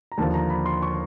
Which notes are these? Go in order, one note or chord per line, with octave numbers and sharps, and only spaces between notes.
A#5
D#2 D3 F3 A5
A#5
B5
C6
C#6